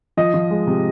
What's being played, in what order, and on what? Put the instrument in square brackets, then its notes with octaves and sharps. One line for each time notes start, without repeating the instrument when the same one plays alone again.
[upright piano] F3 D#5
F3
G#3
C3